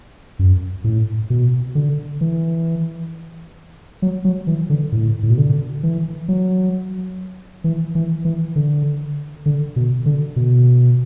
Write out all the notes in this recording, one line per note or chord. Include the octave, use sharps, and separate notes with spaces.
F#2
A2
B2
D3
E3
F#3
F#3
E3
D3
A2
A2
B2
D3
E3
F#3
E3
E3
E3
D3
D3
B2
D3
B2